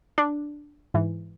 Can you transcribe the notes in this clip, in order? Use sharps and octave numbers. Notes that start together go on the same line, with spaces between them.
D4
G#2 E3